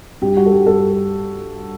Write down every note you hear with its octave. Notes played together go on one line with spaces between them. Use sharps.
G2 G4
G3 F#4
A4
G2 G4
G2 A4